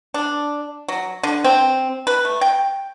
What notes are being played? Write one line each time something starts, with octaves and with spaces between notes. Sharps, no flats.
D4
F#3
D3
C4
B4
A3
G5